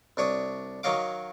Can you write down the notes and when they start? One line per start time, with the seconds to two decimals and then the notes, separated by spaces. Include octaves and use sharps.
0.17 C2 D4 C#5 D#6
0.83 D#3 F#3 C#5 D#5 F5 D6